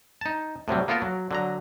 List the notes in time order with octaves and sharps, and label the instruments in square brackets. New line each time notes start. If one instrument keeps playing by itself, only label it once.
[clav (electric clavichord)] D#4 A5
A2 C3 F#3 G3
A#3 B3 F4 A4 A#4
F#3
D3 F#3 A#5